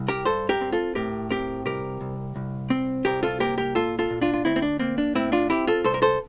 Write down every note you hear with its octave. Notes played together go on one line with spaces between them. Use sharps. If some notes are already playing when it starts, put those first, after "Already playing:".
Already playing: C2
G4 A#4
G2 A4 C5
G4 A#4
C4
F4 A4
A2 G4 A#4
C4 G4 A#4
C2 G4 A#4
C2
C2
C4
C2 G4 A#4
F4 A4
A#3 G4 A#4
G4 A#4
A#2 F4 A4
F4 A4
A#2
D4 F4
F4
D2 C4 E4
C4
D4
A#3 C4
D4
A2 C4 E4
D4 F4
C4 E4 G4
F4 A4
C2 A4 C5
A#4
A4 C5